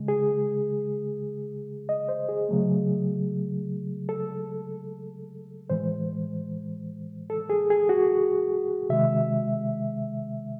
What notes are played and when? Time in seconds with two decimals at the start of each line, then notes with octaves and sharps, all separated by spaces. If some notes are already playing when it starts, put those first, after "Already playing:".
Already playing: C#3 G#3
0.08 G#4
1.89 D#5
2.09 C5
2.29 G#4
2.49 C#3 F#3 A3
4.09 A4
5.70 A2 E3 G#3 C5
7.30 A4
7.50 G#4
7.70 G#4
7.89 F#4
8.89 C3 D#3 G#3 E5